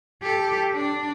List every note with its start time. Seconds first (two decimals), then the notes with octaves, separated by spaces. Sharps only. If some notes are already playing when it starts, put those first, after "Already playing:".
0.22 G4 A4
0.74 D4